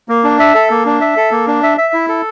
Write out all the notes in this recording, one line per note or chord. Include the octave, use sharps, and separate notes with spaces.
A#3
D4
E5
A4
A#3
D4
E5
A4
A#3
D4
E5
E5
E4
A4